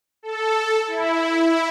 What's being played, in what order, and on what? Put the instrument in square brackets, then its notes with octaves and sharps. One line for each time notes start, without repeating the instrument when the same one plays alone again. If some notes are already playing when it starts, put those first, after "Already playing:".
[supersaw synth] A4
E4